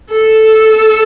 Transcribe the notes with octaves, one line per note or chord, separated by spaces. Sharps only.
A4